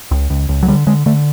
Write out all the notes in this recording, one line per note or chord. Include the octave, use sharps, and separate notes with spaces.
C#2
C#2
C#2
F#3
D3 G3
D3 G#3
D3 A3